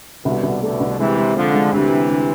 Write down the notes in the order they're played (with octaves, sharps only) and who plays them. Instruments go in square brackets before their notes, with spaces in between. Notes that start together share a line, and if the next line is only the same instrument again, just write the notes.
[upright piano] C2 [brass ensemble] B2 D3
[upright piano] C2
[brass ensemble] B2 D3 [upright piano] A3
[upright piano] C2
[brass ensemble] C3 E3 [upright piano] G#3
[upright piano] G#3
[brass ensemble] D3 F3 [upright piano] C4
[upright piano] G#3
[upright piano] D2 [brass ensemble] C3 E3
[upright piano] D2
D2